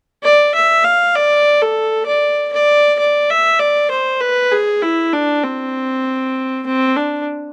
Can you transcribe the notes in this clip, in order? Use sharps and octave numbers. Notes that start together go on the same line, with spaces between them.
D5
E5
F5
D5
A4
D5
D5
D5
E5
D5
C5
B4
G#4
E4
D4
C4
C4
D4